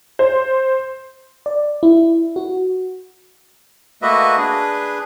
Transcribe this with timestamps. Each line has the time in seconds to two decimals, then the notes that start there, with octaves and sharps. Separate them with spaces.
0.19 C5
1.46 D5
1.83 E4
2.36 F#4
4.02 A3 A#3 F#4 B4 D#5 E5
4.38 D4 G#4 B4